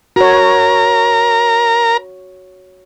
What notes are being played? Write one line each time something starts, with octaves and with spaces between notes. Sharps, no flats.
F#4 A#4 C#5 A#5